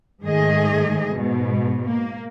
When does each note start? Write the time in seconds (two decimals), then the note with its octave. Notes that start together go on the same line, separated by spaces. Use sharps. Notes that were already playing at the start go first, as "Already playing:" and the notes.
0.23 G#2 D#3 A3 G#4 D#5
1.13 G#2 B2
1.86 A#3